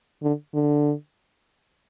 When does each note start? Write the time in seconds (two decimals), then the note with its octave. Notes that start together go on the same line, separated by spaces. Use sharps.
0.23 D3
0.54 D3